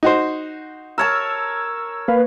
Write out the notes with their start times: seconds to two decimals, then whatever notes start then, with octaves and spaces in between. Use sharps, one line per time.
0.03 D#4 F#4 C5
0.98 A#4 C#5 A5 E6
2.08 A#3 B4 F5